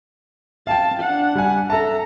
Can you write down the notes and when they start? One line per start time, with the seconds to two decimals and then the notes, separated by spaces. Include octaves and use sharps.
0.67 F5 G5 A5
1.00 D4 F#5
1.35 G3 G#5
1.70 A4 E5 A5 A#5